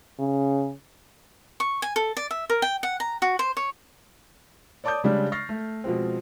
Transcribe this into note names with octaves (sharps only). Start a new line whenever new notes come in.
C#3
C#6
G#5
A4
D5
E5
A#4
G5
F#5
A#5
F#4
C5
C#5
C#5 D5 A5 D6 D#6 G6
C#3 G3 G#3 D4
C#6 F6 A6 A#6 C7
A3
B2 F3 G#3 C4